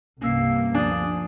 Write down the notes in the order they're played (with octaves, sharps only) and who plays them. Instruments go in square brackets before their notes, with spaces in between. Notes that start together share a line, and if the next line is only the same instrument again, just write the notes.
[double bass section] C2 G2 C3 [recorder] A#3 [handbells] C#4 E6 C7
[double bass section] D2 F3 [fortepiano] D4 [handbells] G#5 D#6